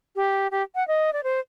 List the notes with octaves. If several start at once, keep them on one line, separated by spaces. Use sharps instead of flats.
G4
G4
F#5
D#5
D5
C5